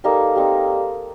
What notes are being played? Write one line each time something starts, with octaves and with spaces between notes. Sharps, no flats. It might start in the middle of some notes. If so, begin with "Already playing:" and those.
G3 A#3 D#4 A4
G3 C4 D#4